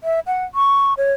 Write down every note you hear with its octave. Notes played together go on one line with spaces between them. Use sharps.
E5
F#5
C#6
C#5